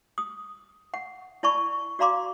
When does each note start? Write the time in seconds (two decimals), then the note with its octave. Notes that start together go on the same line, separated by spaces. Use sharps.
0.18 D#6
0.94 F#5
1.43 E4 D5 A5 B5 C#6
1.99 F#4 D5 F5 A#5 C6 D6